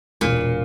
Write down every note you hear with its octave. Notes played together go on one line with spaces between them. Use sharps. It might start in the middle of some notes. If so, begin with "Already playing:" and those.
E1 A#2